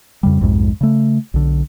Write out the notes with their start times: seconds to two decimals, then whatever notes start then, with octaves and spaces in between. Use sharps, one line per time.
0.23 F2 C#3 G3
0.41 B1 F2 G#2 G#3
0.81 C#3 A3
1.34 B1 D3